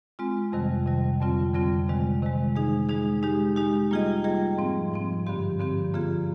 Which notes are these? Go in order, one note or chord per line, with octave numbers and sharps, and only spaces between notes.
G#3 C4 F4
F2 C3 D#3 G3
F2 C3 D#3 G3
F2 D3 G3 C4 F4
F2 D3 G3 C4 F4
C3 D#3 G#3
C3 D#3 G#3
G#3 D#4 G#4
G#3 D#4 G#4
G#3 D#4 G4
G#3 D#4 G4
G3 A#3 F4 G#4 D#5
G3 A#3 F4 G#4 D#5
G#2 F3 C4
G#2 F3 C4
G2 D3 F3 C4 G4
G2 D3 F3 C4 G4
D3 F3 A#3 F4 G#4